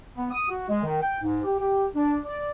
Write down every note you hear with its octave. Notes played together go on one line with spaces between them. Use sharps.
B3
D#6
F#4
G#3
D#3
G5
G#2
G4
G4
D4
D5